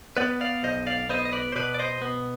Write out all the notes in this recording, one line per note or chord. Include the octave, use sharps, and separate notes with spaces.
B3 B4 D5
D5 F5
B1 C5 D#5
D5 F5
B3 C5 D#5
D#5
B4 D5
C5
B2 B4 D5
D5
C5 D#5
B3